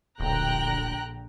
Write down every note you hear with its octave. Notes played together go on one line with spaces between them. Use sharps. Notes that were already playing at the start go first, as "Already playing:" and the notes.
D1 A#1 D3 G5 A#5 F#6